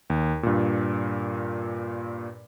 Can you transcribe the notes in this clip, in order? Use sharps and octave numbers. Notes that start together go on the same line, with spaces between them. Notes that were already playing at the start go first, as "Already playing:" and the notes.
D#2
G2 A#2